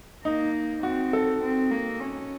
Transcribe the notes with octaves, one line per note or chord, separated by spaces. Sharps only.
A#3 D#4
C4 F#4
A4
C4
A#3
C#4